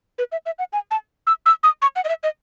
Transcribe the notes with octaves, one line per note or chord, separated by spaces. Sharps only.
B4
E5
E5
F#5
G#5
A5
E6
E6
D#6
C#6
F#5
D#5
E5
D#5